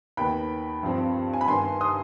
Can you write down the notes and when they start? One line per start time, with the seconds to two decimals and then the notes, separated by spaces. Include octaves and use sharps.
0.17 D#2 D#3 B3 G5 B5
0.83 G2 F3 C4
1.34 G#5
1.41 B5
1.47 G2 D#3 B3 G#5 C6
1.81 C6 D#6